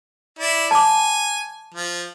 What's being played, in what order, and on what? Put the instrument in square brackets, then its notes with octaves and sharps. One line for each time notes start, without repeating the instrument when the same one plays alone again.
[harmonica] E4 D5
[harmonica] G#5 [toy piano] A5 D6
[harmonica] F3